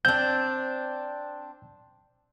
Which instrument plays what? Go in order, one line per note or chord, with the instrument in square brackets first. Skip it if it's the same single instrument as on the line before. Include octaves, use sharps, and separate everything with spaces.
[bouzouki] C4 D4 [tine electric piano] G6